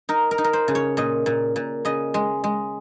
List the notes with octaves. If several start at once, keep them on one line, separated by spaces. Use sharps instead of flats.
D#4 A#4
A#4
D#4
A#4
C5
C#3
C#5
A#2 D#5
A#2
A#2
C#3 D#5
G#3
G#3